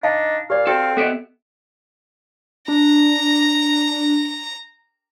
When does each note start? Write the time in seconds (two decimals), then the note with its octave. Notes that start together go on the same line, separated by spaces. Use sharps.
0.03 D4 D#4 F5 A5
0.50 A#2 G4 D5 F5
0.67 C4 F#4 A4
0.97 B3 A4 D#5 E5 F#5 G5
2.68 D4 A#5